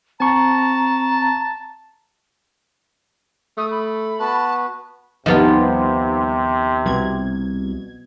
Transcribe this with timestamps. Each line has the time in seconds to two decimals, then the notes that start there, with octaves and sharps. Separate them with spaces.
0.20 C4 A5 A#5 C#6
3.57 A3 D#6
3.71 B5
4.20 B3 F#4 B4 A5
5.26 D#2 C3 F3 G3 B3 D#4 F4
6.85 C2 B2 G#6